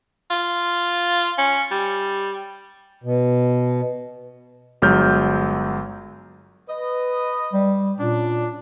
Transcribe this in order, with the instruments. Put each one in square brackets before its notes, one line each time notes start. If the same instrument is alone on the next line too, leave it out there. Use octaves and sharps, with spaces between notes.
[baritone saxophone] F4
C#4
G3
[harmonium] B2
[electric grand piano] G1 F#3 G#3 F6 G6
[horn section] B4 D#5
[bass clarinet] G3
[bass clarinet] A#2 [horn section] C#4 D4